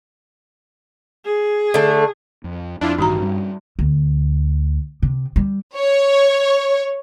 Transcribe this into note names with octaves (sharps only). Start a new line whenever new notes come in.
G#4
D3 A3
F2
F2 D4 E4 F4
A1 G2 D#3 D#4 F#4 A#5
G3 C#4
D2
C3
G3
C#5